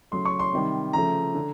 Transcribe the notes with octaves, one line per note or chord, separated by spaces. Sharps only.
C#3 F#3 A3 C6
C#6
C6
C3 D#3 G3
C#3 F3 A3 A#5
D3